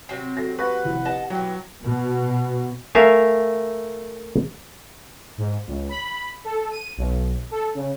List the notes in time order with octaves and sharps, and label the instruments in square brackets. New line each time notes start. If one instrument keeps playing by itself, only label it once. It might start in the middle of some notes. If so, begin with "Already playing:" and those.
[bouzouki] C3 F#3 C4 [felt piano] C7
[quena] F#4 [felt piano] A4 A#6
[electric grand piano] B4 [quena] F#5 [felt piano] C#6 A#6
[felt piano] F1 E4
[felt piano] G4 [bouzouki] D#5 A5
[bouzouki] B2 E3 [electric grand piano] F#3 [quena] G5
[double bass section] B2
[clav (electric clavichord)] A3 A#4 E5 F5 G#5
[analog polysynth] G#2
C#2
B5
A4
D#7
B1
A4
C#3